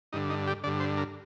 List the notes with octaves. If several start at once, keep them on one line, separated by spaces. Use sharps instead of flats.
G2 D3 D#4
D#4
G4
G2 D3 D5
C5
A#4